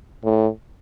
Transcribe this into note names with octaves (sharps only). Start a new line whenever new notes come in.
A2